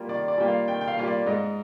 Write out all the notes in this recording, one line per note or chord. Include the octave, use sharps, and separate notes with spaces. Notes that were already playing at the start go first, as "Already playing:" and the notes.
Already playing: G3 A#3 F4
D#3 D5
D5
G3 A#3 F4 G5
F5
D#3 G5
G5
F5
G3 A#3 F4
D5
G#2 D#5